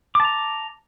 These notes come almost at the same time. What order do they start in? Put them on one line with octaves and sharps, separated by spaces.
D6 A5 A#5